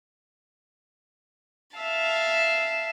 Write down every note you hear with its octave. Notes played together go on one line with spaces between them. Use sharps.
E5 F5 A5